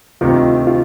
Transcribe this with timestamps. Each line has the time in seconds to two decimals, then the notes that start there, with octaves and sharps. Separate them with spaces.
0.21 D2 C3 D#3 F4
0.67 F4